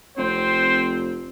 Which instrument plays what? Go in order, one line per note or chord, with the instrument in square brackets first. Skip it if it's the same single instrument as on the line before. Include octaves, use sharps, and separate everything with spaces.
[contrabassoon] F1 [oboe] C4 [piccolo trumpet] C5